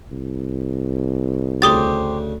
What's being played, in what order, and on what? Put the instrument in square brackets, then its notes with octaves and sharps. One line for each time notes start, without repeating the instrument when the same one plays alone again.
[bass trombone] C2
[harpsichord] D2 C#3 [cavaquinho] G4 C5 [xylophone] D6 D#6 A6